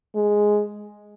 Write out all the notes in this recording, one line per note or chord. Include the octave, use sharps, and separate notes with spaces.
G#3